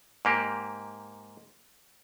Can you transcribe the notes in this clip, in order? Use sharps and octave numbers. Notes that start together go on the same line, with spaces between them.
G#2 A#3 G4